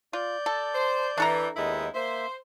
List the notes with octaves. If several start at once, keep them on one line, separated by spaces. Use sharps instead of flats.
F4 D5 G6
A4
C5
E3 D4 A4 A#5
D#2 G#3 B3 D#4 E4
A#3 C5 E5